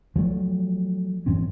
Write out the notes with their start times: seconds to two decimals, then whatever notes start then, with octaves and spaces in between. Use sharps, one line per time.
0.16 F3 F#3 A3
1.26 G#2 E3 C4 C#4